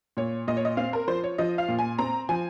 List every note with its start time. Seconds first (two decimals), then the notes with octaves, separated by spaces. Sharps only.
0.17 A#2 C#5
0.47 A#2 D#5
0.57 C#5
0.65 D#5
0.77 C4 F5
0.93 A#4
1.08 F3 C5
1.24 C#5
1.38 F3 D#5
1.58 F5
1.68 A#2
1.79 G#5
1.98 C4 A#5
2.29 F3 G#5